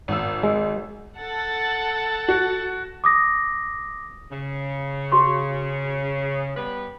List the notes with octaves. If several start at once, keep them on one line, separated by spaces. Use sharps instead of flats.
G#1 E6
G#3
A4 F#5 A6
F#4
D6 D#6 A#6
C#3
F#4 C6 C#6
G3 B3 B4